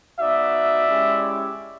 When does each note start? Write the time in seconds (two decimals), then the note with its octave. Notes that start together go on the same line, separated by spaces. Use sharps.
0.20 B3 D#4 F#4 D5 E5
0.86 G#3 C#4 E4 G4